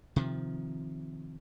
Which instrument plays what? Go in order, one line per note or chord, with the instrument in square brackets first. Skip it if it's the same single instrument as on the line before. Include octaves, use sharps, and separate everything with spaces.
[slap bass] C3 D#3 F3